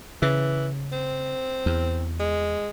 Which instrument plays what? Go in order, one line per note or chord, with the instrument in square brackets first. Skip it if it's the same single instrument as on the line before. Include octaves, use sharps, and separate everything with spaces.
[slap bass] C#3 [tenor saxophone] E3
[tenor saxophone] C4
[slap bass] E2
[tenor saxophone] G#3